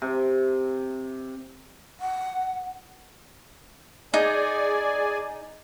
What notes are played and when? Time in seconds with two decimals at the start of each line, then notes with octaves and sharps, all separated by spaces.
0.02 C3
2.00 F#5
4.14 D#4 G#4 D5 G#5